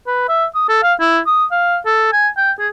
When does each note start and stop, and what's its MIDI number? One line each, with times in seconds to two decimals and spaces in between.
0.07 0.24 71
0.29 0.45 76
0.55 0.64 87
0.69 0.82 69
0.83 0.94 77
1.00 1.19 64
1.27 1.45 87
1.52 1.78 77
1.86 2.10 69
2.13 2.28 80
2.37 2.52 79
2.59 2.68 68